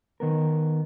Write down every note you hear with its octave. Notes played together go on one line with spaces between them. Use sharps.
D#3 B3 A#4